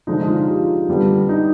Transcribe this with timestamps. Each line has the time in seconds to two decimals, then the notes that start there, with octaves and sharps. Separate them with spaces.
0.07 D3 F3 G#3 D#4
0.17 D#4
0.28 F4
0.38 F4
0.48 G4
0.88 D3 G3 B3
1.29 D#4